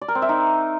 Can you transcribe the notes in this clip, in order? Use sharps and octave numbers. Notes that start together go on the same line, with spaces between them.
D5
A#4
C4
E5
D#4